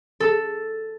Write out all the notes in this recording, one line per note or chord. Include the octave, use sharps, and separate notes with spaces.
A4